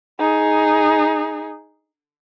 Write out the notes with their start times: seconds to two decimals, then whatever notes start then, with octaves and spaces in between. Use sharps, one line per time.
0.20 D#4 G#4